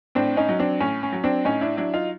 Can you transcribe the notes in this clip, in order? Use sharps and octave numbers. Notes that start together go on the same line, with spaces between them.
A2 C4 D4
C#4 D#4
F#3
C4 D4
A2 C#4
C#4
F#3
C4 D4
A2 C#4 D#4
D4 E4
F#3 D4 E4
D#4 F4